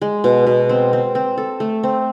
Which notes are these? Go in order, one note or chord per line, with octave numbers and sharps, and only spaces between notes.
G#3
B2
B2
C4
C4
C4
A4
A3
C4